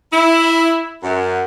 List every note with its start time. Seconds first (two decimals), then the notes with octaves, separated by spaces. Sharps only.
0.12 E4
1.03 F#2